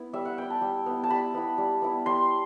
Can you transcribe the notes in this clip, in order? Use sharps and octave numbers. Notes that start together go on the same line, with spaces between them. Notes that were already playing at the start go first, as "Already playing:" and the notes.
Already playing: B3 E4
G3 E5
F#5
B3 E4 G5
A5
G3
B3 E4
A5
G3 B5
B3 E4
G3
B3 E4
G3 C6